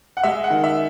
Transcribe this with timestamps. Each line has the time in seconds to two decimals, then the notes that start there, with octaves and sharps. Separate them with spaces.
0.17 F#5
0.23 G#3 E5
0.44 F#5
0.50 D#3
0.64 E5